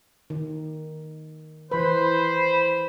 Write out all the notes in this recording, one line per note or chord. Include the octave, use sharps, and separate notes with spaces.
D#3
E3 B4 C5 B5